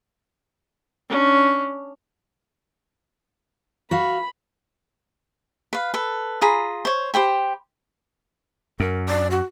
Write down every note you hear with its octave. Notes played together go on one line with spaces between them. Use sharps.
C#4 D4
F#4 E5 F5 B5
B4 F5
A4 B4
F4 G#4 A#5 B5
C5 C#5
G4 C5 G5 B5
F#2 A#4
D5
F#4